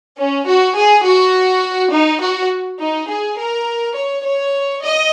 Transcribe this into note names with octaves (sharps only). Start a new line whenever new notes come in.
C#4
F#4
G#4
F#4
D#4
F#4
D#4
G#4
A#4
C#5
C#5
D#5